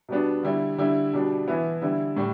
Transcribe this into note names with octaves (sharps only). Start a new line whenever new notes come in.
B2 G3 B3 D4
D3 G3 E4
D3 G3 E4
B2 G3 D4
E3 B3 E4
D3 G3 E4
A2 G3